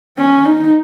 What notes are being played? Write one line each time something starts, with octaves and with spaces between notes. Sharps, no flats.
C#4
D#4